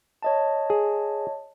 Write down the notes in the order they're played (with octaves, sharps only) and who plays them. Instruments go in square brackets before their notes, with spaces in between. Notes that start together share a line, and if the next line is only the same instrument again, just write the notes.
[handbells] C#5 D#5 A5
[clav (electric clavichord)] G#4